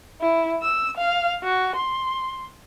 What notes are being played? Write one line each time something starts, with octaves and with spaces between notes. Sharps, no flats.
E4
E6
F5
F#4
C6